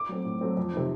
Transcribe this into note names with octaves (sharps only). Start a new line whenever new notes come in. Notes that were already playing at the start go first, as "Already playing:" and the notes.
Already playing: D6
F#3 A3 C4
A2
F#3 A3 C4
F2
C3 D#3